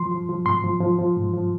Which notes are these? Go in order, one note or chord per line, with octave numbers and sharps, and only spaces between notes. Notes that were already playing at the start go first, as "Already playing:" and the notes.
Already playing: F3 C6
F3
F3
G#2 C6
F3
F3
F3
G#2
F3